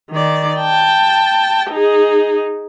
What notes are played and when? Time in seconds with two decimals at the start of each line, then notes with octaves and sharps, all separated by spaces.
0.10 D#3 D5
0.60 G5 A5
1.71 D#4 G#4